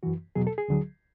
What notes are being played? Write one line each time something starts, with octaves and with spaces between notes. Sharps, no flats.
F#2 E3 F#4
E2 B2 F#3 G#4
A4
G#4
D2 D3 F#3